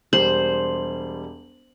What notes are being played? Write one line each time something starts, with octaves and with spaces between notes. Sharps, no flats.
E1 G3 C5 F#7